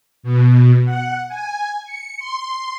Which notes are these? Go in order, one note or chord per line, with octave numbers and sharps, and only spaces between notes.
B2
F#5
G#5
C#7
C6